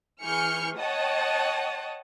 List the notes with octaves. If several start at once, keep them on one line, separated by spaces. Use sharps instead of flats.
E3 G#4 C#6 F6 G6 C#7
C#5 D#5 F#5 G5 A5 D#6